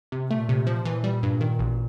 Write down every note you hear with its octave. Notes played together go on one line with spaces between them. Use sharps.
C3
A#2 A3
C3
F3
A#2 E3
G3
G2
D#3
A1